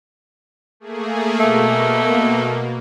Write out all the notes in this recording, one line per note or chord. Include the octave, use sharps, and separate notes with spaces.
A3 A#3 G#4
B2 A3 A#3